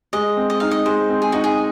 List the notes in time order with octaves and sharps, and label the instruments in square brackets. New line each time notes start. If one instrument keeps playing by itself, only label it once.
[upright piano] G#3 [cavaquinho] D#5
[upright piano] C4
[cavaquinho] D#5
[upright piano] D#4 [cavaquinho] F5
[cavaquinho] D#5
[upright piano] G#3 [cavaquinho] C5
[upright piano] C4
[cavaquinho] G#4
[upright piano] D#4 [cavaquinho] F#4
[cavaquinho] G#4